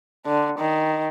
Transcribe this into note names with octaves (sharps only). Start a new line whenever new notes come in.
D3
D#3